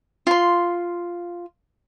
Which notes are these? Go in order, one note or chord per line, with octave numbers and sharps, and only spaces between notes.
F4 C6